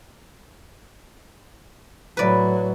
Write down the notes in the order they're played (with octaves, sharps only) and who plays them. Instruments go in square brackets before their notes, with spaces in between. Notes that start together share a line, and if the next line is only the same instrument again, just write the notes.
[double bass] A2 F#3 [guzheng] B4 D5